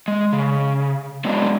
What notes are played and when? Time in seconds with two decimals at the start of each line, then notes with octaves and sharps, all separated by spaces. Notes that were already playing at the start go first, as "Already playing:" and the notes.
0.08 G#3
0.33 C#3
1.25 F#3 G#3 B3 D4